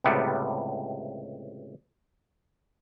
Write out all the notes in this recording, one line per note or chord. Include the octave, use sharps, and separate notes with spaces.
C#2 A2 C3 G3 B3